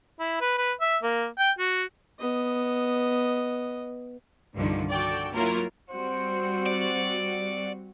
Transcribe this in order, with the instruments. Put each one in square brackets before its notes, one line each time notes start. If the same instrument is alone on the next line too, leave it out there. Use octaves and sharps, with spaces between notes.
[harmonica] E4
B4
B4
E5
A#3
G5
F#4
[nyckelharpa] B3 D#5
[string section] C2 G2 D3 D#3 F3
F#4 A4 D5 G5
F#3 A#3 E4 F4 A#4
[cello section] G3 C4 F#4 [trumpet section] C5
[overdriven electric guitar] D5